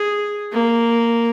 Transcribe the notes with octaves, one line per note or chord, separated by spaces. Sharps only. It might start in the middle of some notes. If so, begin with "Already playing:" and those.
Already playing: G#4
A#3